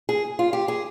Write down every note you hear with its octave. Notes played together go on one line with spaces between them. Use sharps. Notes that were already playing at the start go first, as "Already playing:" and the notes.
G#4
F4
G4
G#4